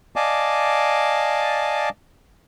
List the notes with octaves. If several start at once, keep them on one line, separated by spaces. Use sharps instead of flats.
D5 D#5 F5 G#5 A5 D6